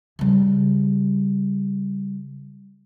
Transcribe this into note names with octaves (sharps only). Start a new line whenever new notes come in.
C#3 G3